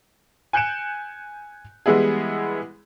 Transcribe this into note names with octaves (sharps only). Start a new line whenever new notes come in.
G#5 F#6 G6 C#7 D7 E7
E3 G3 G#3 B3 E4 G#4